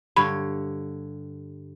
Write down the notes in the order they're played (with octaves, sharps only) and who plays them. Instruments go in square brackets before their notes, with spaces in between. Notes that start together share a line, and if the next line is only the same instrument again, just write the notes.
[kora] G2 D3 C#5 [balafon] B5